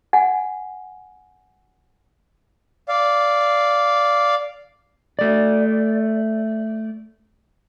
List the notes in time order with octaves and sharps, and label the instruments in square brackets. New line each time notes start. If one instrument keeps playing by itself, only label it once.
[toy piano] F#5 G#5
[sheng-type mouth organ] D5 F5
[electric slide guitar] A3 D5